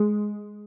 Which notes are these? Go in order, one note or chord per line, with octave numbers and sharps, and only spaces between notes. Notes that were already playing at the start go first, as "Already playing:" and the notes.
Already playing: G#3